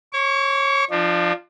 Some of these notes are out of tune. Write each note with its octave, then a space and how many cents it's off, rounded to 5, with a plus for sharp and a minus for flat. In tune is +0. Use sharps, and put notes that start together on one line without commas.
C#5 -25 C#6 +40
F3 +0 D4 +35